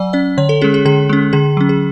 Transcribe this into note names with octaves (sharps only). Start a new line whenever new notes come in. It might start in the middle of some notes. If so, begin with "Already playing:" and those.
Already playing: F#3 D5 F#5 G#5
C#4 D5
D3 C#5
A4
G#3 C#4 G#4
G#4
D3 G#4
G#3 C#4
D3 G#4
F#3 C#4
G#4